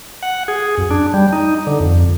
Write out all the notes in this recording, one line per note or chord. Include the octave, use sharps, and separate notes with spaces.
F#5
G#4
F#2
D4
G3
D#4
D3
F2